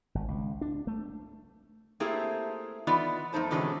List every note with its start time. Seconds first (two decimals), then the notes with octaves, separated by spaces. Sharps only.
0.15 G#1
0.28 C#2
0.61 D4
0.87 A3
2.00 A3 A#3 C4 E4 G4 G#4
2.87 E3 B3 D#4 F4 D5
3.33 F2 A3 D#4 C5 A5
3.51 B2 D3 E3 G#3 C4 C#4